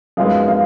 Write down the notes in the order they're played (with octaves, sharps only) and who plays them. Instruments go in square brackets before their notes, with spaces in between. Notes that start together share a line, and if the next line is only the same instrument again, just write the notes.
[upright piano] F#2 F3 G#3 B3 D#4 [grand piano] F5
[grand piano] F5